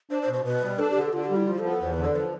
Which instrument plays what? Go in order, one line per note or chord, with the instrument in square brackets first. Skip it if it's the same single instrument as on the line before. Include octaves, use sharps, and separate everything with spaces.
[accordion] D4 [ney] C5
[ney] C5
[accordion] B2
[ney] C5
[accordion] B2 [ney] B4
[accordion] G3
[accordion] D4 [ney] A4
[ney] G4
[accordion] D3
[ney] A4
[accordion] D3 [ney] F4
[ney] G4
[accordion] G3
[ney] E4
[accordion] F3 [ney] F4
[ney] A4
[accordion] B3
[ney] A4
[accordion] E2 [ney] C5
[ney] B4
[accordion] D3
[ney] D5
[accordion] F3 [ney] B4